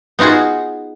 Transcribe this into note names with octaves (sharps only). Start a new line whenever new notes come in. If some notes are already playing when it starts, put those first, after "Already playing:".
B3 D#4 F4 F#4 G#4